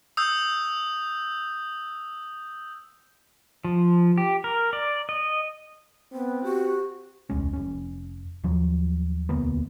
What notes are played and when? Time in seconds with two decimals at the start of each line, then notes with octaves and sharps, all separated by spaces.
0.17 D#6 E6 G6
3.64 F3
4.18 G4
4.44 A#4
4.73 D5
5.09 D#5
6.13 B3 C4
6.44 F#4 G4
7.30 E1 C#2 G#3 C#4
7.53 F1 C#4
8.44 D#2 F3 F#3
9.29 E1 D2 A#3 B3